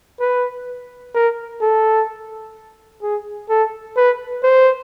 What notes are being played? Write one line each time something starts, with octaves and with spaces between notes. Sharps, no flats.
B4
A#4
A4
G#4
A4
B4
C5